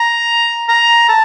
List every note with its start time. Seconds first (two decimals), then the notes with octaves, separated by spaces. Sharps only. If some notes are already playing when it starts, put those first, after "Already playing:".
Already playing: A#5
0.69 A#5
1.09 A5